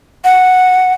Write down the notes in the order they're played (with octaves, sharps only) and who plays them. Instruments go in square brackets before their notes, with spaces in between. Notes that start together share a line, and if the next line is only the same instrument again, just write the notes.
[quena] F#5